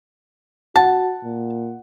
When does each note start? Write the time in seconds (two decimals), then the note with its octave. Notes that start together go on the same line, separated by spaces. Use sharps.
0.76 F#4 F#5 A5
1.24 A#2